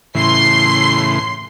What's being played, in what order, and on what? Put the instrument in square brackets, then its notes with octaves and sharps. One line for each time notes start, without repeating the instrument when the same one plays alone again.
[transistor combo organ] A2 C#3 E3 [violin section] C6 C7